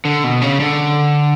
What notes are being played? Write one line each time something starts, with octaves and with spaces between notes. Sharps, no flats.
D3
B2
C#3
D3